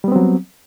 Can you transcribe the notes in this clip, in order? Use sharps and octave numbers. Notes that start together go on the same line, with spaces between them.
F#3 G3 B3 C4